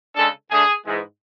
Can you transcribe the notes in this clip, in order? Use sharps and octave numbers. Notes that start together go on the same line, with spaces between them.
C#3 G#3 D4 A4
D3 A3 D4 G#4
G#2 E3 G#3